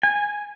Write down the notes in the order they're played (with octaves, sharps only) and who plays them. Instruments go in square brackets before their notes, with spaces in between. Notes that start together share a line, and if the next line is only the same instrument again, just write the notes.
[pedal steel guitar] G#5